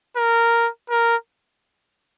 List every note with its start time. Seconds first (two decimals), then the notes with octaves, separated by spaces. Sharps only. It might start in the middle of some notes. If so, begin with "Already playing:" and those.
0.17 A#4
0.90 A#4